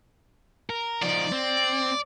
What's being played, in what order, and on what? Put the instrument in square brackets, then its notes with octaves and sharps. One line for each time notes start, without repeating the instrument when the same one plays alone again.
[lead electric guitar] A#4
[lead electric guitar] F3 D#4 [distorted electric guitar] D5
[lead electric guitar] C4